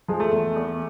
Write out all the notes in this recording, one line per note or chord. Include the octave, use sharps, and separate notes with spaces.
F3 G#3
A3
E2
E2